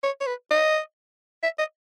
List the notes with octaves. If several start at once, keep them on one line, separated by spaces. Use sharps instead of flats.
C#5
C#5
B4
D#5
E5
D#5